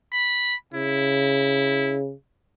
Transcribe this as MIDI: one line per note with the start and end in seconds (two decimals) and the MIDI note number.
0.14 0.55 83
0.74 2.13 49
0.74 1.99 64